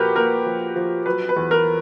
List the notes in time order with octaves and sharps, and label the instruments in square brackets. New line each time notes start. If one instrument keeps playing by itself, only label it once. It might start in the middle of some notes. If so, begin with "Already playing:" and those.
Already playing: [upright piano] A#2 F3 F#4 G4 A#4 B4
A#3 A#4
F3
F3
F#3 B4
B4
E2
A#4